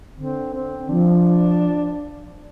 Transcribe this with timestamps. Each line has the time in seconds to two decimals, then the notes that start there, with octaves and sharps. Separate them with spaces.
0.17 D3 C4
0.54 C4
0.89 F3 D4